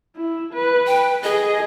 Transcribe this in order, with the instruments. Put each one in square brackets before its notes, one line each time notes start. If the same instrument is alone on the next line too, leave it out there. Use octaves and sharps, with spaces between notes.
[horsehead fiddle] E4
B4
[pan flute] G5
[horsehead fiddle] G#4 [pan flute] D#5